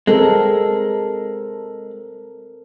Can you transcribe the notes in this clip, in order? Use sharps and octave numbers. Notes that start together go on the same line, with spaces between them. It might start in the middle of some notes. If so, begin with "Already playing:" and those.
G#3 C4 A4 A#4